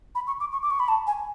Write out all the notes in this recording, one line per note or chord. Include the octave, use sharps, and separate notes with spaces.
B5
C#6
D6
C#6
D6
C#6
B5
A5
G#5